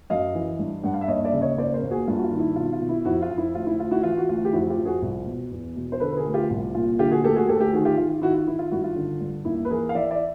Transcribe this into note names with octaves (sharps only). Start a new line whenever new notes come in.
F#2 D#5 F5
E3
G2
G2 F#5
F5
E5
D#2 C#5 D#5
D5 E5
C#3
C#5 D#5
D#2 C5 D5
A#4 C5
D#2
F#4 G#4
G2 F4
F#4
F4
D#3
E4
B2 F4
F4
B2
E4
F2 E4 F#4
F4
F2
E4
D2 F4
E4
D2 F4
E4 F#4
E3 F4
F#4
D2 F4
G4
F2 E4 F#4
F4 G4
F2
F#4 G#4
C2
B2
E2
B2
C5
D3 A4 B4
B4
G#4 A#4
D2
F4 G4
C2 F4
A#2 F4
D3 F4 G4
F#4 G#4
D2 G4 A4
F#4 G#4
D2 G4 A4
G4 A4
D#3 F#4 G#4
F4 G4
D#3 F4
F4
D#3 E4 F#4
F4
D#3 E4
F4
G2 E4 F#4
F4
D3
G2
D#2 E4
B4
E3 G#4 A#4
F5
E3 D5 E5
D5 E5